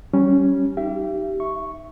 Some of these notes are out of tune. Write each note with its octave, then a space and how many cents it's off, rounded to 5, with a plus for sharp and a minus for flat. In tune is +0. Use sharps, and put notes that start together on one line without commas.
G3 -20 C#4 +0
D#4 +0 G4 -20 E5 +40
E5 +0 C#6 -5